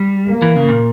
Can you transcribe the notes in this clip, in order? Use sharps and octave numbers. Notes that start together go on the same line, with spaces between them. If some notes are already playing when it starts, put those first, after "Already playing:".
Already playing: G3
A#3
E3
C#3
A#2